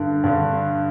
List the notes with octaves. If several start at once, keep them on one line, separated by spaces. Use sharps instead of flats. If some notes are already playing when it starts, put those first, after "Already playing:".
Already playing: G2 D3
G2 D3